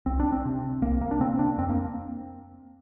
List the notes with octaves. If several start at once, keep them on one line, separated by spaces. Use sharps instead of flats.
C2 C4
D4
C4
C3
C2 A#3
A#3
D4
C3 C4
D4
F2 C4
A#3